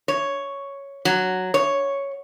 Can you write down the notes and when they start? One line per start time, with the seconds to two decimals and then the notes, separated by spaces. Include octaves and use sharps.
0.08 C#5
1.05 F#3
1.54 C#5